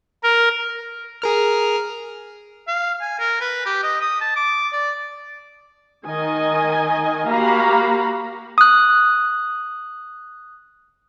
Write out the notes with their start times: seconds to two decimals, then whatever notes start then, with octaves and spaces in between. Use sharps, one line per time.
0.24 A#4
1.22 G#4 A#4 F6
2.68 F5
3.01 G#5
3.19 A#4
3.41 B4
3.66 G4
3.83 D#5
4.01 D#6
4.21 A5
4.36 D6
4.73 D5
6.07 D#3 D#5 G#5
7.29 A#3 F#4 G4 F5 A#5 B5
8.58 D#6 F#6